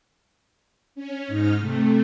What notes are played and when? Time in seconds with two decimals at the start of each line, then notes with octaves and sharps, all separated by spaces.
0.95 C#4
1.28 G#2 D#4 F6
1.60 C3 A3